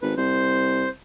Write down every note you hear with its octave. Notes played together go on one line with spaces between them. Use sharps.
G#1 B4
C2 C5